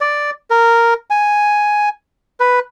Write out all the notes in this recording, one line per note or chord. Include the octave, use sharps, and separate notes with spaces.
D5
A#4
G#5
B4